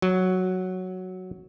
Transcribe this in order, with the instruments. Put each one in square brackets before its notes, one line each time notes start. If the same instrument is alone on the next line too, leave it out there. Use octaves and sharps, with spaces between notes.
[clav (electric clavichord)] F#3